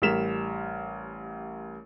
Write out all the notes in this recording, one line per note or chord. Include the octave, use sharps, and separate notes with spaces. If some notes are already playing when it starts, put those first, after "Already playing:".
A1 G3 A#4 B6 E7 F7